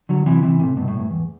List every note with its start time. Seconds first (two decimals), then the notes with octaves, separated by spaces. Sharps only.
0.09 D3 F#3
0.26 C3 E3
0.43 C3 E3
0.60 A2 C3
0.77 G2 B2
0.88 A2
0.99 G2
1.10 E2